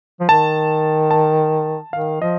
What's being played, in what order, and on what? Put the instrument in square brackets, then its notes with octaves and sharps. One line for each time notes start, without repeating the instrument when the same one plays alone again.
[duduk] F3
[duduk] D#3 [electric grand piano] A5
[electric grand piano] A5
[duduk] D#3 [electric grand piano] F5
[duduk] F3 [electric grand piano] D#5